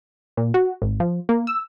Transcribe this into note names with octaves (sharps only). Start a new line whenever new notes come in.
A#2
F#4
G#1
F3
A#3
E6